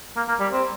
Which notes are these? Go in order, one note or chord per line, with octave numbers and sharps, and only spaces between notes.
A#3
A#3
G3
C4